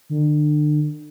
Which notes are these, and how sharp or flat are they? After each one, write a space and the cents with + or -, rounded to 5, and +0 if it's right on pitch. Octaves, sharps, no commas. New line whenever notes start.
D3 +40